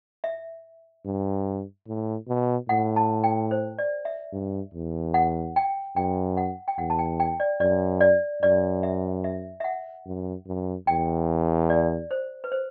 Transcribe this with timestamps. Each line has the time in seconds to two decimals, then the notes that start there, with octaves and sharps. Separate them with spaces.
0.24 E5
1.06 G2
1.87 A2
2.28 B2
2.69 A2 F#5
2.96 A5
3.24 G5
3.51 C5
3.78 D5
4.05 E5
4.32 G2
4.74 E2
5.14 F#5
5.56 G5
5.96 F#2 G5
6.37 F#5
6.68 G5
6.78 E2 F#5
6.90 A5
6.99 G5
7.20 G5
7.40 D5
7.60 F#2 D5
8.01 D5
8.42 F#2 D5
8.83 E5
9.24 E5
9.60 E5
9.64 F#5
10.06 F#2
10.47 F#2
10.87 E2 G5
11.70 D5
12.11 C5
12.44 B4
12.52 C5